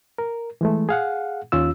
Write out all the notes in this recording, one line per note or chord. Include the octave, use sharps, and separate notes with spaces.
A#4
E3 G#3 A3
G#4 F5 F#5
D#2 C#4 F4 E6